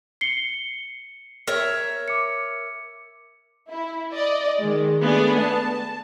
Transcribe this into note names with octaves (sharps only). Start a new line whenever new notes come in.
C7 C#7 G7
A#4 C#5 E5
D6 C#7
E4
D5 D#5
D#3 G#3
A3 B3 D4 G#4 D5
A5